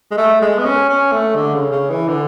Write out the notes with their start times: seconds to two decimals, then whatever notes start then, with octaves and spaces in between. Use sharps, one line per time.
0.11 G#3
0.17 A3
0.41 G#3
0.58 B3
0.65 C#4
0.89 C#4
1.12 A3
1.36 D3
1.55 C#3
1.72 C#3
1.90 E3
2.08 D3